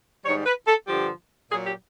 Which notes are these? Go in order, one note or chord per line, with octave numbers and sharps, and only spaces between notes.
G#2 D#3 G3 C#5
B4
A4
G2 D3 F3 G4
A#2 F#3 G#4
G4